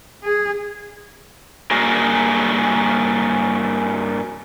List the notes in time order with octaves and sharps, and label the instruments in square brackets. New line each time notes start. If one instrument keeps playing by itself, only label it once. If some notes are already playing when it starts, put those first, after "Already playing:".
[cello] G#4
[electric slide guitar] G2 A#3 F#4 G#4 A#4